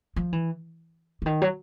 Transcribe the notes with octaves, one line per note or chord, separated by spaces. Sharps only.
F3
E3
D3
D#3
F#3